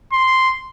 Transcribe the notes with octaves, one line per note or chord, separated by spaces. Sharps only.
C6